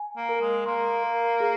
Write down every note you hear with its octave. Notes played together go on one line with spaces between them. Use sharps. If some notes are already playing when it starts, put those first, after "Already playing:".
Already playing: G#5
A#3
A#4
G#3
A#3 C6
A#4
G#4